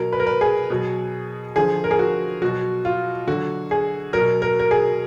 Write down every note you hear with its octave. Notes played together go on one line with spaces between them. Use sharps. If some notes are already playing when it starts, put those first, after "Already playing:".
Already playing: B2 F#3 A#4
B4
A#4
B4
G#4
B2 F#3
D3 F3 G#4
A#4
G#4
F#4
B2 F#3 F#4
F4
D3 F#3 F#4
G#4
F#3 A#4
B2
A#4
A#4
G#4